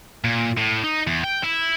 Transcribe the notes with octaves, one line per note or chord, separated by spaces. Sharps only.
A#2
A2
D#4
E2
G5
E4